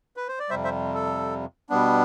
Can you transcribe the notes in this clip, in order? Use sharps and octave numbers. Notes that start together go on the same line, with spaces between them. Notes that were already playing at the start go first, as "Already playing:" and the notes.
B4
C5
D5
F2 C3 G3 C5 E5
C5 E5
A4
B2 G3 B3 D4